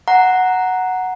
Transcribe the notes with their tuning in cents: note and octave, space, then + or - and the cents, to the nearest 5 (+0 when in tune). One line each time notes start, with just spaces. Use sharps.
F#5 +0 A#5 +0